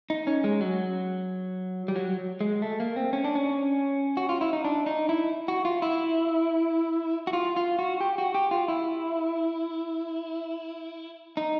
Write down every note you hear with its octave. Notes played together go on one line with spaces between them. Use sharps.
D#4
C#4
G#3
F#3
G3
F#3
G#3
A3
A#3
C4
C#4
D4
C#4
F#4
F4
E4
D#4
D4
D#4
E4
F#4
F4
E4
F#4
F4
F4
F#4
G4
F#4
G4
F4
E4
D#4